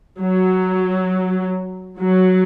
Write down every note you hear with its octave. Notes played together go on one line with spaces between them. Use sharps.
F#3
F#3